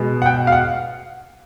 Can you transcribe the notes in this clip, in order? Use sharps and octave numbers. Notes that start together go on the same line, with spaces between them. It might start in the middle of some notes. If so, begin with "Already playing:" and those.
Already playing: B2 G#3 B3
F#5
G5
F5
F#5